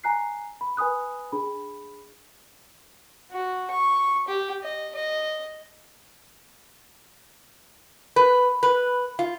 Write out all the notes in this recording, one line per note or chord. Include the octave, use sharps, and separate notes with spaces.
G#5 A#5 F#6 C7
B5
B4 G#5 B5 D#6 F#6
D4 G#4 B5
F#4
C#6
G4
D#5
D#5
B4
B4
F4